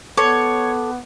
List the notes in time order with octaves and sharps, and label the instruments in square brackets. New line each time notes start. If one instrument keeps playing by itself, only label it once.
[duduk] B3 [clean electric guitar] A4 [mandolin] C#5 [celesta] D6